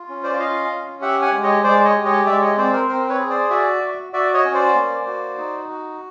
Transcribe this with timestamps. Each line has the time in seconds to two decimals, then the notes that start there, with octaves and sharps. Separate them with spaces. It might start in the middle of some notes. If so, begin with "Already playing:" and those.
Already playing: F4
0.09 C#4
0.24 C5 D5
0.39 F4 D#5 F5
0.71 C#4
1.01 G4 E5 F#5
1.22 F#5 G#5
1.32 G#3
1.43 C#5 D#5
1.64 G#3 C5 D5
1.85 C#5 D#5
1.95 G4
2.05 C#5 D#5
2.26 G#3 D5 E5
2.41 C#5 D#5
2.57 C4 C5 D5
2.73 A#4 C5
2.88 C4 A#4 C5
3.09 B4 C#5
3.20 G#4
3.30 C5 D5
3.50 F#4 D5 E5
3.82 F#4
4.13 F#4 D5 E5
4.33 C#5 D#5
4.45 C#4
4.54 C5 D5
4.75 A#3
5.07 F#4
5.37 D#4
5.69 F#4